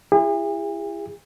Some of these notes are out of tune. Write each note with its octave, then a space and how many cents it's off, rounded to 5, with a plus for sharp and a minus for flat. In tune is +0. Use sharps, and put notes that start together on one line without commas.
E4 +30 G#4 -45